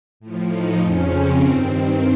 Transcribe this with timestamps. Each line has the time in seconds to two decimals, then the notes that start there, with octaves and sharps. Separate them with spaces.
0.20 A2 F3
0.49 D#4
0.79 F2 C#3 F3 C#4
1.09 C4
1.39 G2 D#3